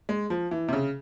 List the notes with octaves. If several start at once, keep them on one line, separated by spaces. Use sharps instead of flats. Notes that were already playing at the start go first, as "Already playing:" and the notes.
G#3
F3
E3
C3
C#3